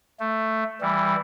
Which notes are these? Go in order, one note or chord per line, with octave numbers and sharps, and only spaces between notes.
A3
E3 G3